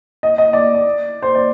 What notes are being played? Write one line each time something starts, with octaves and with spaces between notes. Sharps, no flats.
D#5
D#5
D5
D5
C5
D5